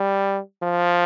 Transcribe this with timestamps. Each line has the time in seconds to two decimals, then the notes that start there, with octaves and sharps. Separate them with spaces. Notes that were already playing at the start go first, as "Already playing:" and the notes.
Already playing: G3
0.63 F3